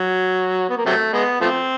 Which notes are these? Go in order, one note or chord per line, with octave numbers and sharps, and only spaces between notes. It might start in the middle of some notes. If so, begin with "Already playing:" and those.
Already playing: F#3
B3
A#3
C3 F#3 A3
G#3 B3
F3 A3 C4